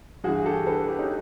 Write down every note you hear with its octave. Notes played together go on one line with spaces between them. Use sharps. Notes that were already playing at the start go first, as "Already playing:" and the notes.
G2 E3 F#4 G#4
G4 A4
A4 B4
G4 A4
C#4 D#4